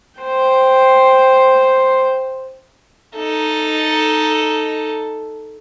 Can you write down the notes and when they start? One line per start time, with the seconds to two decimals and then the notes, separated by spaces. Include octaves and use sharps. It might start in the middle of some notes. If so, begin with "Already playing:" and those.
0.20 C5 G5
3.16 D#4 A4